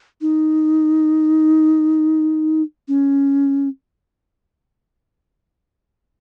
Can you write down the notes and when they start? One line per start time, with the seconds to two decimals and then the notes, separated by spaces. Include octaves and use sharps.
0.21 D#4
2.88 C#4